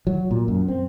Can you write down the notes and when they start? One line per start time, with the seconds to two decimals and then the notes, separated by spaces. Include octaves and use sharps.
0.07 F#3
0.31 A#2
0.48 F#2
0.68 C4